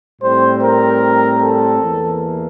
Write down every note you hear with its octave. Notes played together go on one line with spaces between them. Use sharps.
A2 G3 C4 C5
A#4
A4
E2 E3 A#3